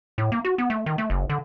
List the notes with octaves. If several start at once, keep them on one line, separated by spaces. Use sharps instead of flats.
A2
A#3
F#4
B3
A3
D#3
A3
F#1
D3